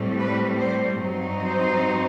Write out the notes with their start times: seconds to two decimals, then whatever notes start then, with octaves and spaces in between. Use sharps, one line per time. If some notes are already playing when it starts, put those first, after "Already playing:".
Already playing: A2 G3 C4
0.18 B4
0.59 C5
1.01 G2 F#3 C4 D#4
1.42 C5